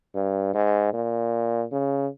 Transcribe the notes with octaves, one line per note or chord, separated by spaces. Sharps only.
G2
G#2
A#2
C#3